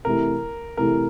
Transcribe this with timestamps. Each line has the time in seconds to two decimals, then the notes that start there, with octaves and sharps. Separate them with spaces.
0.05 C3 E3 A3 E4 A#4
0.77 C3 E3 A3 E4 A#4